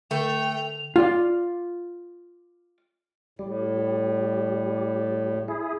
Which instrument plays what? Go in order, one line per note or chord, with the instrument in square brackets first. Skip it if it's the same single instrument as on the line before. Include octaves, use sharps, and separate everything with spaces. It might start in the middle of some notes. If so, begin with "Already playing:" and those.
[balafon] D3 [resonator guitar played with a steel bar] A3 [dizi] G5 [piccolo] F7
[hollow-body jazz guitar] F4 D5
[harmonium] A2 [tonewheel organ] G3
[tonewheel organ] E4 G#4